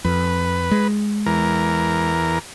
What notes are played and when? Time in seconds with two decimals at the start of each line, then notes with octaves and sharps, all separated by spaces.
0.05 F2 B4
0.71 G#3
1.26 E2 A#4